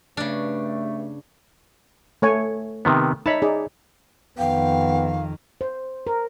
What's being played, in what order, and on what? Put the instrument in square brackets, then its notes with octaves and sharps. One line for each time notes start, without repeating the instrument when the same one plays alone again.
[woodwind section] G2 A3 [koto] C#3 D4
[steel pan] A3 C#5 G#5
[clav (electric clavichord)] C3 D#3 B3
[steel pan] D#4 E5 B5 [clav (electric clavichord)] C#5 A5
[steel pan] D#4 G#4 D5
[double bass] F2 D#3 [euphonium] B3 [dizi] F5 [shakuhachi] G5
[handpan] C5
A#4